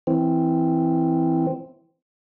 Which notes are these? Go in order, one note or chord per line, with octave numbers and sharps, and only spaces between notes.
E3 C4